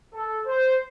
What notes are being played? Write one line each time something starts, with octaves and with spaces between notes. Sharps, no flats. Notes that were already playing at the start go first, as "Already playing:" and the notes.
A4
C5